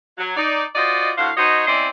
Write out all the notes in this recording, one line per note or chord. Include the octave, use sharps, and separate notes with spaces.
F#3
D#4 D5
F4 F#4 C5 D5 D#5
A2 D4 F#4 C5 F5
D#4 F#4 C5 C#5 D#5
C4 C#4 E4 C5 D5 D#5